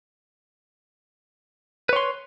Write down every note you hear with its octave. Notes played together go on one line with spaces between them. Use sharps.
B4 C#5 C6